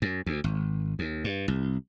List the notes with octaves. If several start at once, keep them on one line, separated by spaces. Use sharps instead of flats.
F#2
D2
G#1
D#2
G2
C2